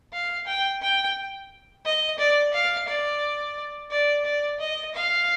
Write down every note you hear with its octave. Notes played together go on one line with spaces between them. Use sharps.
F5
G5
G5
D#5
D5
F5
D5
D5
D5
D#5
F5